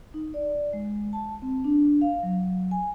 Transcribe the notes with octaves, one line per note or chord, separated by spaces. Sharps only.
D#4
D5
G#3
A5
C4
D4
F5
F#3
G#5